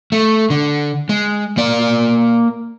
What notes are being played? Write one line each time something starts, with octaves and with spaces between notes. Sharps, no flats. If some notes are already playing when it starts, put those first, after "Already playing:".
A3
D3
G#3
A#3 D5